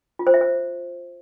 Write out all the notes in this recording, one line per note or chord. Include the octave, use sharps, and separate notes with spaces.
F4
C5
E5
C5